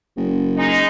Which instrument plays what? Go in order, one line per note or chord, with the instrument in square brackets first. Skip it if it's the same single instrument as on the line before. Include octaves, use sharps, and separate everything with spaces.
[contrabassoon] F#1
[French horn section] G#3 D#4